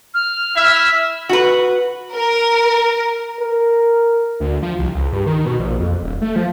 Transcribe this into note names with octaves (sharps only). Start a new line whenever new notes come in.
F6
E4 E5
F#4 B4
A#4
A#4
D2
F3
C2
C#2
G2
D#3
B2
A#1
F2
D#1
A3
F3